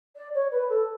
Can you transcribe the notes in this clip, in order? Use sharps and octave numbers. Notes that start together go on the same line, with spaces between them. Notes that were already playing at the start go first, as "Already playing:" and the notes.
D5
C#5
B4
A4